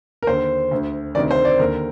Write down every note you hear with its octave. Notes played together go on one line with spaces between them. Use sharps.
A#4
D#2 D3 C5
D2 D3
D2 C3 D#3 D5
C5
D5
D#2 D3 A#4